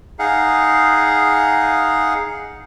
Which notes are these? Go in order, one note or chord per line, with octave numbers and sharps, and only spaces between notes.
D#4 G#4 F5 F#5